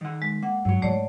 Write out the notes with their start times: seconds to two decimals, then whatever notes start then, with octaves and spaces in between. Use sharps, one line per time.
0.01 D#3 F#5
0.22 G#3
0.43 A#3 F#5
0.65 G2 F#3 F#4
0.82 G#2 G#3 A3 C#5 D5